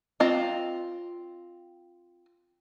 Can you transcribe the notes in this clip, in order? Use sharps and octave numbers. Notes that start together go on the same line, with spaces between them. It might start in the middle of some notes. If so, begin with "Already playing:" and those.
C4 F4 D#5